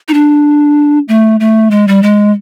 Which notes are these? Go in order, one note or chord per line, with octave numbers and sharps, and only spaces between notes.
D#4
D4
A3
A3
G#3
G3
G#3